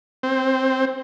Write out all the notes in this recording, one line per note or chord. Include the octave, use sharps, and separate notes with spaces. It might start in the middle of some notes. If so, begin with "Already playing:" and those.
C4